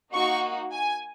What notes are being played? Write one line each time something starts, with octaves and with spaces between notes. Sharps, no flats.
A#3 D#4 F#4 C#6
G#5